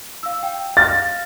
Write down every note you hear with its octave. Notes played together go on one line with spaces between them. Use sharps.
F5 E6
G5
F5 F6 A6 A#6